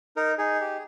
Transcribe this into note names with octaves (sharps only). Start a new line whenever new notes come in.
D#4 A#4
D#4 G#4
G4